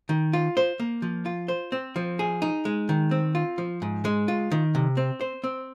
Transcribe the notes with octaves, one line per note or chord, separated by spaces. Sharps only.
D#3
F4
C5
A#3
F3
F4
C5
C4
F3
G#4
D#4
G#3
D#3
C4
F4
F3
G#2
G#3
F4
D#3
C3
C4
C5
C4